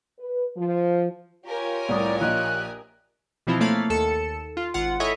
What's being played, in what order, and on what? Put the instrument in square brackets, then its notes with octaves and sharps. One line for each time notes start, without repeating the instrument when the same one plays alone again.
[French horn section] B4
F3
[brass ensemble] F4 C#5 [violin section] G4 A#4 G#5
[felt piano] C2 A2 D#6 [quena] D5
[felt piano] A#1 D#5 [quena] F#6
[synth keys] B2 E3 F3 C4 E4 F4
A3 A#3 C#5 F5 B5 A6
D#2 A4 C#7 E7
F4
G#1 F4 F#5
E4 A4 C#5 D#5 E5 G#5